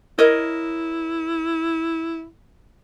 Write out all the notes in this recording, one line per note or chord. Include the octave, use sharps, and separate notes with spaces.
E4 A#4 C#5 D#5